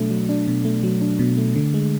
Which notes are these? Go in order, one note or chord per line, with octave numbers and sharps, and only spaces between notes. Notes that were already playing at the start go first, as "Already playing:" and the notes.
Already playing: B2 F#3 A3 D4
F#3
D4
B2
A3
F#3
D4
B2
A3
D3
G#3